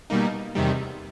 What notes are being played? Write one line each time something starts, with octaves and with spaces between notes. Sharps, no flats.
B2 G3 A#3 D#4
E2 C3 D#3 G3